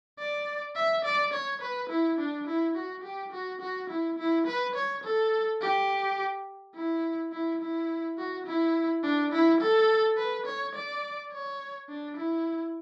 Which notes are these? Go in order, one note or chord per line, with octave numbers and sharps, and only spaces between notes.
D5
E5
D5
C#5
B4
E4
D4
E4
F#4
G4
F#4
F#4
E4
E4
B4
C#5
A4
G4
E4
E4
E4
F#4
E4
D4
E4
A4
B4
C#5
D5
C#5
D4
E4